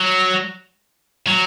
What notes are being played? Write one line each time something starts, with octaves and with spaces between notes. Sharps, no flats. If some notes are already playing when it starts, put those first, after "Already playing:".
Already playing: F#3
F#3